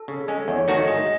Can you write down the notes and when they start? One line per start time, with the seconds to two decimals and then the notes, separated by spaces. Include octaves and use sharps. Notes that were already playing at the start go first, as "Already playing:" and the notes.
Already playing: A4
0.08 C#3
0.28 G#3 C#4
0.48 E2 C#5
0.68 D#3 A3 D#4 F#4 D#5
0.88 G#2 D#5